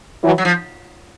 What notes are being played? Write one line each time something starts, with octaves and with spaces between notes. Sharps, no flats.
E3 F#3
F#3
F3